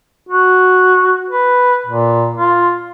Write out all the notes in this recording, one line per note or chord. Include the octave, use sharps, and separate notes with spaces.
F#4
B4
A#2
F4